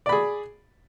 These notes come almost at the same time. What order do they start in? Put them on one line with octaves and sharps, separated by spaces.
D5 B5 G#4